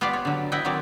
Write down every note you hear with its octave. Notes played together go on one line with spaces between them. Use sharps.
B3 F4 G4 B4 D5
C#5
D3 F#3
E4 B4 D#5 F#5 G5
D#3 F#3 C4 C#5 D5